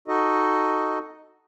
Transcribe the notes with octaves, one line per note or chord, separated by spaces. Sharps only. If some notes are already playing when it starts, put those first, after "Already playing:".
D#4 F#4 A4 D#5